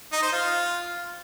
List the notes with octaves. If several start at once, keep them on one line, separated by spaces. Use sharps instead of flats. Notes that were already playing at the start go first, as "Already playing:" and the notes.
D#4
C5
F4